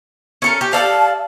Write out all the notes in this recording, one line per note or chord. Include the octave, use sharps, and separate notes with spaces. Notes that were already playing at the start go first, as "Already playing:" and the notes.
C#4 A4 A#4
G4
D5 F5 A5